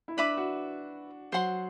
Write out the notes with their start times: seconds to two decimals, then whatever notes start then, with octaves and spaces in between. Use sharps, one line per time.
0.08 E4
0.17 D4 B4 E5 B5 D6
0.37 F#4
1.32 F#3 C5 F#5 C6